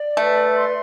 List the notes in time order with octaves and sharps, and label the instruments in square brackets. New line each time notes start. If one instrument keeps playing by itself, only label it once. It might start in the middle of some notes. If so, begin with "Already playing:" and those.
Already playing: [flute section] D5
[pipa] A3 [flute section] B4
[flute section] C6